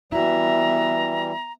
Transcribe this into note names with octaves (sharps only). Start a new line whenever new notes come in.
E3 G3 B3 E4 F#4 E5 A#5